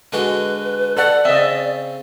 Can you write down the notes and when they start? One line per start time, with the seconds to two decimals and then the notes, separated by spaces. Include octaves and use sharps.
0.13 D3 G#3 F#4 B4
0.97 A4 D5 F#5
1.25 C#3 C4 D#5 E5